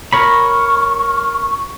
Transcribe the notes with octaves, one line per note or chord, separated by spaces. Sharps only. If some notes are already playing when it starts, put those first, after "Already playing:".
A#4 C#5 B5 C#6